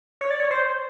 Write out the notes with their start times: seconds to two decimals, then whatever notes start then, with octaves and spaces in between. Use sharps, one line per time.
0.21 C#5
0.31 D5
0.40 C#5
0.51 C5